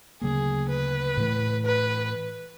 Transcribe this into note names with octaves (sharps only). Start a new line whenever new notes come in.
D2 C#3 F#3 A#3 G#4
B4
A2 E3 A3
B4